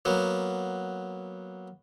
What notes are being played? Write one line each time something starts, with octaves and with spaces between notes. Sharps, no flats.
F#3 A#3 B3